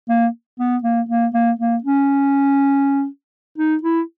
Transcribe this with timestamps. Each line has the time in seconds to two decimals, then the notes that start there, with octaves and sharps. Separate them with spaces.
0.09 A#3
0.59 B3
0.84 A#3
1.09 A#3
1.34 A#3
1.59 A#3
1.84 C#4
3.58 D#4
3.83 E4